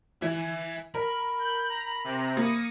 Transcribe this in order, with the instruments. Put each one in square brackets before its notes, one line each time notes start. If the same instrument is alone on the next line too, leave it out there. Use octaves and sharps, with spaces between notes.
[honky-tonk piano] E3 [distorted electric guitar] E5 G#5
[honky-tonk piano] A#4 [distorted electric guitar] B5
[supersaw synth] G6
A#5
C3 A#5
[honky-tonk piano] A#3 [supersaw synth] D#6 A#6 C#7